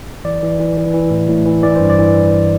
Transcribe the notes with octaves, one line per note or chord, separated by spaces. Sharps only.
E3 D5
E3
E3
E3
E3
A2
A2
E3
E3 D5
G2 C5
D5
E3